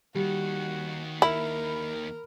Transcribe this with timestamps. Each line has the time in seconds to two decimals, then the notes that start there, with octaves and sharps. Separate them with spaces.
0.15 D#2 D#3 G3 F#4
1.22 E4 A#4 B5